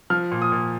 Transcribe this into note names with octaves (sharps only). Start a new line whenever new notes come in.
F3 F6
A#2
D#6
A#2